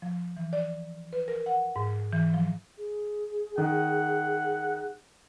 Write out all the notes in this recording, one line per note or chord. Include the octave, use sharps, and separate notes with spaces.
F3
E3
D5
B4
A#4
F#5
G#2
E3
F3
G#4
D#3 F#5